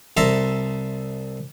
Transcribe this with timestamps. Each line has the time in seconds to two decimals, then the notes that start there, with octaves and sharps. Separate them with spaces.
0.17 C2 A4 E5 A#5 C6